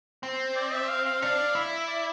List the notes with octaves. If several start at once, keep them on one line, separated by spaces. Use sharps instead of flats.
C4
D5
E5
F5
F5
D4 F5
E4 E5
D5